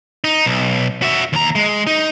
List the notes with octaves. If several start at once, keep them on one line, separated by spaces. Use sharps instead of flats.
D#4
B1
F#4 E5
D#2 A#5
G#3
D#4